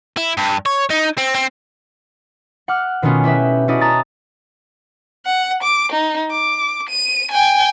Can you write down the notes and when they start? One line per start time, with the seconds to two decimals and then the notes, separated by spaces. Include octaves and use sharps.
0.17 E4
0.37 G2
0.66 C#5
0.90 D#4
1.18 C4
1.35 C4
2.68 F#5 D6 F6
3.02 B2 D#3 A3 B3 C#4 F4
3.24 E4 G4 B4 E5
3.68 C#4 E4 F#4 A4 D5 D#5
3.81 A5 A#5 D#6 A6
5.26 F#5
5.63 D6
5.92 D#4
6.31 D6
6.89 D#7
7.31 G5 G#5